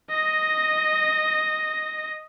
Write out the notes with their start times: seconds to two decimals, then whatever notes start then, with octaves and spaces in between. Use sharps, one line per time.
0.11 D#5 A#6